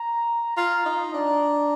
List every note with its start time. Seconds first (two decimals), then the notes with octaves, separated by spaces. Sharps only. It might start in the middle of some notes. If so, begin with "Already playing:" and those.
Already playing: A#5
0.57 F4 A#5
0.85 D#4
1.14 D4 A#5